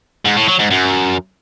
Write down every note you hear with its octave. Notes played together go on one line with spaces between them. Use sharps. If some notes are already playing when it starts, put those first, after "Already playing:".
G#2
A2
F#3
G#2
F#2